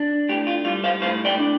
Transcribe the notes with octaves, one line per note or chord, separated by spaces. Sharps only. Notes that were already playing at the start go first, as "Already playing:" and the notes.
Already playing: D4
A2 G4
F4
G3 F4
C5 F5
A2 C5 F5
D5 G5
D4